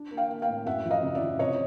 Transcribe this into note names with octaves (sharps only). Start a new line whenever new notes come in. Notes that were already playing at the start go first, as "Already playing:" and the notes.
Already playing: D4
A#3
F5 G5
A#3
F5 G5
A2
F#2 E5 F#5
F3
D#5 F5
C#3
D5 E5
F3
C3 C#5 D#5